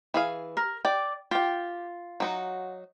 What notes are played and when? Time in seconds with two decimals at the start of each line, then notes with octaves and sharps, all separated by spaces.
0.14 E3 G#4 F5
0.57 A#4
0.85 D5 G5 D6
1.31 F4 G4 G5
2.20 F#3 D#4 F#4